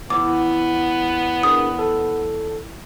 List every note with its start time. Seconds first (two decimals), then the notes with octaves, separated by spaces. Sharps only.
0.10 E2 B3 D6
1.43 D4 G#4 A#4 D#6
1.79 A4